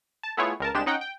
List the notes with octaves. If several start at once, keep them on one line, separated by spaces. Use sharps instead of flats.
A5
A3 B3 E4 F4 G#4 C#5
C#2 A#4 A5
C2 G#3 D4 G4 E7
C#4 D#4 F#5 G5
G5